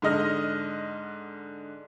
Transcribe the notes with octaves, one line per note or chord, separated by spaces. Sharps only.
G#2 D3 D#5 F6